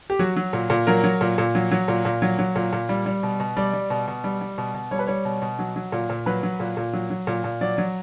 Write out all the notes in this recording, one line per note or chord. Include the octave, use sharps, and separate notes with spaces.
G4
F#3 F#4
F#3
A#2
A#2
F#3 A#4
F#3
A#2
A#2
F#3
F#3
A#2
A#2
F#3
F#3
A#2
A#2
G3
G3
B2
B2
G3 D5
G3
B2
B2
G3
G3
B2
B2
G3 C#5
B4
G3 C#5
B2
B2
F#3
F#3
A#2
A#2
F#3 B4
F#3
A#2
A#2
F#3
F#3
A#2
A#2
F#3 D5
F#3